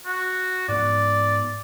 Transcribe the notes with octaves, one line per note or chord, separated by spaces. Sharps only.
F#4
G#2 B3 D5